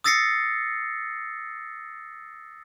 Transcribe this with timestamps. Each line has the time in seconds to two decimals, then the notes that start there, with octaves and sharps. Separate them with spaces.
0.04 D#6 E6 A6 A#6 C7 C#7